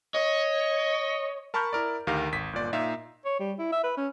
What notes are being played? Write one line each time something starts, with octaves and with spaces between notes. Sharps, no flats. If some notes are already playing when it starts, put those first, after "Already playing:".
C#5 D#5
A#4 A5 B5 C#6 F6 G6
E4 A#4 D5
D2 D#3 G4 A#4 F5 A#6
G#1 B6
G1 A#2 D5
A#2 D#4 E5 F5
C#5
G3
E4
E5
B4
C#4